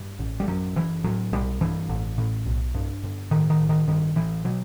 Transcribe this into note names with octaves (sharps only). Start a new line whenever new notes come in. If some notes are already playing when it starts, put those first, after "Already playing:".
Already playing: G2
A1
G3
F#2 F#3
F#1 E3
A2 F#3
B1 G3
G2 E3
A1
A2
B1
G2
G1
A2 D#3
D#3
A1
D#3
G2 D#3
A1 E3
B2 F#3